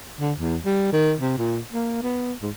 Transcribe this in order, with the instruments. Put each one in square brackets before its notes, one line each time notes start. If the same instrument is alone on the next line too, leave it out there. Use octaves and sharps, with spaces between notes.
[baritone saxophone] D3
E2
G3
D#3
C3
A#2
A#3
B3
G#2